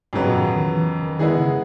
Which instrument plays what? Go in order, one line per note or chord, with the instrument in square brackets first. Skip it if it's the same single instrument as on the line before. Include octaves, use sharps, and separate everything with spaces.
[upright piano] F2 C#3 F#3 B3 [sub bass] G#2
[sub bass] A#2
D#3
D#3
E3
D#3
[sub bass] D#3 [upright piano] G#3 B3 E4 G#4
[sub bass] C#3